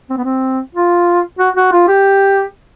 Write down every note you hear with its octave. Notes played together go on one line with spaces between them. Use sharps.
C4
B3
C4
F4
F#4
F#4
F4
G4